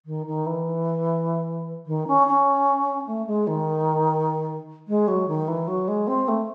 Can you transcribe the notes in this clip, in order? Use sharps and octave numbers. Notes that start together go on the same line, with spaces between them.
D#3
D#3
E3
D#3
C#4
C#4
A3
G#3
D#3
G#3
F#3
D#3
E3
F#3
G#3
C4
A3